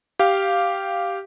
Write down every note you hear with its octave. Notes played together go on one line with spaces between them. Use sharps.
G4 F5